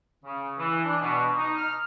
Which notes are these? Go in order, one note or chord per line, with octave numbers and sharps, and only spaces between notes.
C#3
E3
D4
B2
D#4
F6